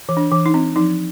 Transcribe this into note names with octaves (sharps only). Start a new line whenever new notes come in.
E3
D4
E3
D#4
C4
F3 D#4